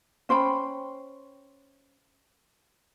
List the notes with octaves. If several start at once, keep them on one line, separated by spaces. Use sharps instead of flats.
C#4 C5 G5 B5